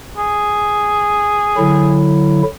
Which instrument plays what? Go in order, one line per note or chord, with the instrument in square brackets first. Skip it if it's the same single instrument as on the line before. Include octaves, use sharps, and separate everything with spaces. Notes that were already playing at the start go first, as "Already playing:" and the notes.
[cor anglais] G#4
[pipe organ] D3 F#3 E4